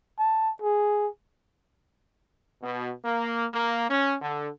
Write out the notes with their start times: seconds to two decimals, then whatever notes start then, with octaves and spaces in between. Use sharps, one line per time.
0.19 A5
0.62 G#4
2.62 B2
3.05 A#3
3.53 A#3
3.90 C#4
4.21 D3